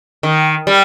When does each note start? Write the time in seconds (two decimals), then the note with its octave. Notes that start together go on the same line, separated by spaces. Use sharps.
0.23 D#3
0.67 G3